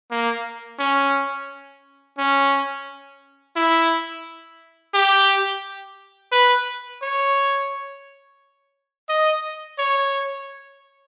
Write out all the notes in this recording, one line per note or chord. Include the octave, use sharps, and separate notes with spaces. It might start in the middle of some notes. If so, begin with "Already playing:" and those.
A#3
C#4
C#4
E4
G4
B4
C#5
D#5
C#5